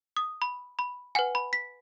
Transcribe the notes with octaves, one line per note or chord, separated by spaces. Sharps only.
D#6
B5
B5
B4 F#5 G#5
B5
B6